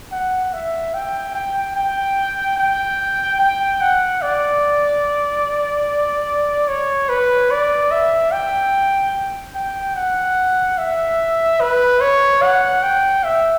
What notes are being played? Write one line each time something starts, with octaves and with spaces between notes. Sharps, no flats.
F#5
E5
G5
G5
G5
G5
G5
F#5
D5
C#5
B4
D5
E5
G5
G5
F#5
E5
B4
C#5
F#5
G5
E5